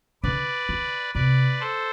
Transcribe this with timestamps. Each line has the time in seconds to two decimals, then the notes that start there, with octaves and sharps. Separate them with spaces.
0.23 D3 B4 D5
0.69 D3
1.14 C3 B4 D5
1.60 A4 C5